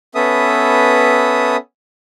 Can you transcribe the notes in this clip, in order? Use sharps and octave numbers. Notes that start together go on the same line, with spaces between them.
B3 C#4 A4 B4 E5 D#6